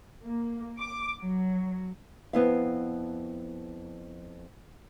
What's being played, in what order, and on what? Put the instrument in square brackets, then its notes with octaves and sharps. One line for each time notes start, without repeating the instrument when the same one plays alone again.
[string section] A#3
D6
F#3
[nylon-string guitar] F2 B3 E4 F5